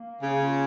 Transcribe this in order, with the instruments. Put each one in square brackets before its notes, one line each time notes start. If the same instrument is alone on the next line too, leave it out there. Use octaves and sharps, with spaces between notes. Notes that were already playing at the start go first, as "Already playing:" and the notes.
Already playing: [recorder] A#3
[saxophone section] C#3
[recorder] F4